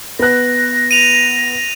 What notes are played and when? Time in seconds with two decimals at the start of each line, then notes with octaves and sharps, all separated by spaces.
0.19 B3 F#6 A#6
0.91 D#7 F7